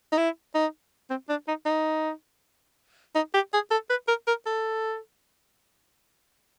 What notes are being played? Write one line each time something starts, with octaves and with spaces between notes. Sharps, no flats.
D#4
E4
D#4
C4
D4
D#4
D#4
D#4
G4
G#4
A4
B4
A#4
A#4
A4